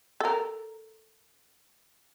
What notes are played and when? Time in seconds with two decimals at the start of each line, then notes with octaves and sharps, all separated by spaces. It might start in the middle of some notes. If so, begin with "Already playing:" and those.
0.20 A4 A#4